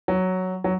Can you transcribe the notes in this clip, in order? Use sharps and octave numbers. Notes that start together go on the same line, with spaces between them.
F#3
F#3